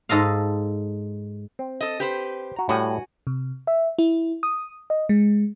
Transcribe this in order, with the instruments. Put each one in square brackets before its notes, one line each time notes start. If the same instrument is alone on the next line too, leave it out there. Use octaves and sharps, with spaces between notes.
[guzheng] G#2 A4 D#5 F5
[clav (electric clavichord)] C4
[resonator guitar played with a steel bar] A4 D#5
G4 B4 C5
[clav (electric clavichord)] F#4 A#5
[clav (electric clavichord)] A2 G3 G4 [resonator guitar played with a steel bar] F#4 F#5 G#5
[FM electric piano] C3
E5
E4
D#6
D#5
G#3